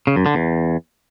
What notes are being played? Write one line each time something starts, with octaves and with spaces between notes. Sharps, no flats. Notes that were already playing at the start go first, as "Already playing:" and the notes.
C#3
F#2
D3
E2